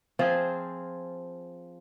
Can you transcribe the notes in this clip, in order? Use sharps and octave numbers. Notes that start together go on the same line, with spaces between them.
F3 C4 F4 G#4